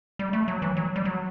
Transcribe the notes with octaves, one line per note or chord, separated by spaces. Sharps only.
G3
A3
F#3
E3
F#3
G3
F#3